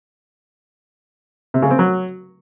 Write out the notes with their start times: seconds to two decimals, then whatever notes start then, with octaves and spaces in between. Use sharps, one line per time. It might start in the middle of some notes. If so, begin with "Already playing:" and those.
1.54 C3
1.62 C#3
1.71 C4
1.79 F#3